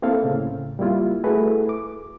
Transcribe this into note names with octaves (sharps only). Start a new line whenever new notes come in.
A#3 C4 E4 A4 F5
A2 C#3
G3 A#3 E4 F4
A3 E4 F#4 G#4 A4 B4
D6